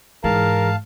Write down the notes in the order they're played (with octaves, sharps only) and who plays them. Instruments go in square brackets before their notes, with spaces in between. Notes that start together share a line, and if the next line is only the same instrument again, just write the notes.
[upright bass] G#2 [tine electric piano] E3 G#4 [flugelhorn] A#4 [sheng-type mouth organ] F5 A5